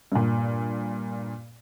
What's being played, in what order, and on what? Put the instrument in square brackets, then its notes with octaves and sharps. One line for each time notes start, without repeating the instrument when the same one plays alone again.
[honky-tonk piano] G2 A#2